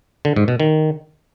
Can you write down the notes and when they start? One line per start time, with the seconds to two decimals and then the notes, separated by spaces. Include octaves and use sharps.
0.25 D3
0.36 G#2
0.48 B2
0.60 D#3